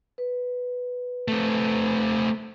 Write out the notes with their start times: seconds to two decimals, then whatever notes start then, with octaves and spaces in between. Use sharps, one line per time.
0.18 B4
1.28 A3 C4